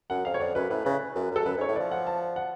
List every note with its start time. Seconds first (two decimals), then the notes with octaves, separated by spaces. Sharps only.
0.10 F#2 F#5
0.25 F2 F5
0.34 C#5
0.40 F2 D5
0.55 F#2 B4
0.70 A2 B4
0.85 C#3 B4
1.15 F#2
1.31 F#2 A4
1.45 F#2 B4
1.57 G#2
1.61 C#5
1.68 A2
1.76 F3 D5
1.91 F#5
2.07 A5
2.36 F#5